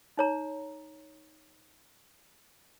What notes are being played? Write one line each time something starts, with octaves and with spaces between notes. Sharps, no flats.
D#4 C#5 A#5